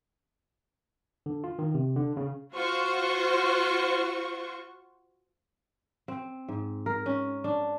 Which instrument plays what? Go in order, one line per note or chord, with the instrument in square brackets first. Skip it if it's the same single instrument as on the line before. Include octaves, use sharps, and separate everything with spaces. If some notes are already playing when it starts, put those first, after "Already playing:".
[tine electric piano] D3
F4
D#3
C3
D3
C#3
[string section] F4 F#4 C5 C#6
[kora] C4
G#2
A#4
C#4
D4